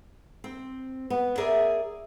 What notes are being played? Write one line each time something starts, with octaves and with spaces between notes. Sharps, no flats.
C4
B3
G#4 A#4 D5 E5